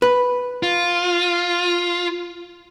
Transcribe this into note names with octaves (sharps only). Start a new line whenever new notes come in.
B4
F4